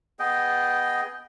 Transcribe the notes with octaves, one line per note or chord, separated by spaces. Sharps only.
B3 G#4 D#5 G5